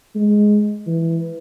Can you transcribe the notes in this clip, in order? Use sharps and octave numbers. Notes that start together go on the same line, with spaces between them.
G#3
E3